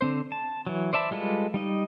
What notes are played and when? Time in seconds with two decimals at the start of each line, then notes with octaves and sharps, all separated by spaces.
0.01 D3 C4 C5
0.32 A5
0.67 E3 F#3
0.93 C5 D5 E5 A5 B5
1.11 G3 G#3 F4 A4 B4
1.54 G3 D#4 D#5